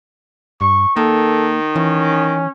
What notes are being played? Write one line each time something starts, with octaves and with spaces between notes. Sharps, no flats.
G2 C#6
D#3 A#3 A4
E3 C#4